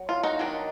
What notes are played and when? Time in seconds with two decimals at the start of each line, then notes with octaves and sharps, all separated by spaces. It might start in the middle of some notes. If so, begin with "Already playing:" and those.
Already playing: F#3
0.09 F4
0.23 D#4 F#4
0.39 D#3 F#3 B3 D4